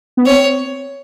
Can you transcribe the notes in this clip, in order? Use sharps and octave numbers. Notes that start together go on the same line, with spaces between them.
B3
C4 C#5